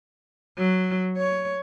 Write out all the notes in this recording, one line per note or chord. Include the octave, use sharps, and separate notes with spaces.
F#3
C#5